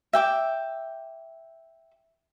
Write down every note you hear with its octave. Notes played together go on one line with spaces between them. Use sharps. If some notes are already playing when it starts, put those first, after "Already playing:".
E5 G5 D6